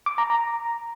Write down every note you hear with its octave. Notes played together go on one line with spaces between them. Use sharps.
D6
A#5
A#5